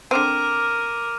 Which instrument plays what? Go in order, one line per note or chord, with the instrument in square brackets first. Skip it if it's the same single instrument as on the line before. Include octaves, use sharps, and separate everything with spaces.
[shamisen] D3 C4 [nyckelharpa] A#4 [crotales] D6 F6 D#7